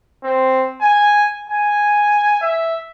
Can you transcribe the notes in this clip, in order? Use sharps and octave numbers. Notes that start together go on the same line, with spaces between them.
C4
G#5
G#5
E5